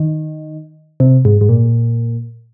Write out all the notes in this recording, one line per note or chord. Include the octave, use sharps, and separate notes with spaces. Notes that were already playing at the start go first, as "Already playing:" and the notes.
Already playing: D#3
C3
G#2
G#2
A#2